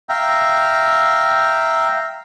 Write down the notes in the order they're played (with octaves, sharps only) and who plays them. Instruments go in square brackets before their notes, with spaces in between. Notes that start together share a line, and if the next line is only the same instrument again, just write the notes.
[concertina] E5 F5 G5 A#5